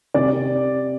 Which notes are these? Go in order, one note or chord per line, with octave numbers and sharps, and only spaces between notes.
C3 D5